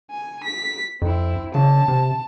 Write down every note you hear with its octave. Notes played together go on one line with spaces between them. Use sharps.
G#5
B6
F2 C4 E4
C#3 A5
C3